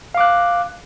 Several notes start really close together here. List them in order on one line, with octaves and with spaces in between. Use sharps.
F5 D6 F#6